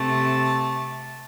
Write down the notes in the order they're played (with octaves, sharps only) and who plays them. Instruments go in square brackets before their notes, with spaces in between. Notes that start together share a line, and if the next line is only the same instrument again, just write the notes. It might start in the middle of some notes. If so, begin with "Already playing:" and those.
Already playing: [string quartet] C3 A3 A5